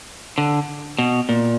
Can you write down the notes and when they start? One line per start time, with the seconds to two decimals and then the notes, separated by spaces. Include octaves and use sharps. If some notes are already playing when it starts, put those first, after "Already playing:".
0.38 D3
0.98 B2
1.29 A#2